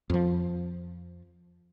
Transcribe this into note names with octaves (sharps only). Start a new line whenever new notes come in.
F2 F3